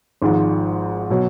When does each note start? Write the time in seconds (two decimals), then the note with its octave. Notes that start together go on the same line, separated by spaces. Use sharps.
0.22 G#1 G#2 F3
1.10 B2 F#3